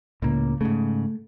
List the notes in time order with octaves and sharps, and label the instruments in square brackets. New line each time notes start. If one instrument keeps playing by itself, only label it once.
[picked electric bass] C#2 A#3 [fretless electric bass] A2 C#3
[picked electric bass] G#2 C#3 [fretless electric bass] A3